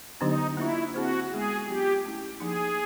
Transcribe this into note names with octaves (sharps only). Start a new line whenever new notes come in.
D3 F#3 B3 D4 D#4 G4
A#3 D4 E4 F4
C4 E4 F#4 G#4 C5
G#3 B3 E4 G#4
F#3 B3 D4 F4 G4
A3 C#4 E4
F3 A#3 D#4 G#4